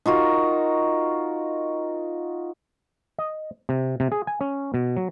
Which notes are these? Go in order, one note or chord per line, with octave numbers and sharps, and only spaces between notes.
D#4 F4 F#4 A#4
D#5
C3
C3
G#4
G#5
C#4
B2
F#3